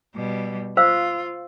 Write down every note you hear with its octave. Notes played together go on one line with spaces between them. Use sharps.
B2 G3
F4 C5 F5 E6